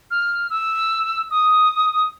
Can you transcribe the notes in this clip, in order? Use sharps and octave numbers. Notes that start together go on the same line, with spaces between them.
F6
E6
D#6